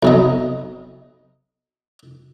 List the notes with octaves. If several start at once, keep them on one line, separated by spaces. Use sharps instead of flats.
B1 C3 D#5